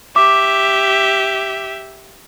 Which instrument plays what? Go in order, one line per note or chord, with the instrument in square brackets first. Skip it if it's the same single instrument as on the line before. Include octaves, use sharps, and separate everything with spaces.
[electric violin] G4 E5 [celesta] D6